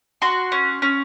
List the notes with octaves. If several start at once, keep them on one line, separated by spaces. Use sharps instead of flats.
F#4 C6
C#4
C#4